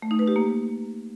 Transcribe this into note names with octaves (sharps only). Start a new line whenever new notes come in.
A3
D#4
B4
G4
A#3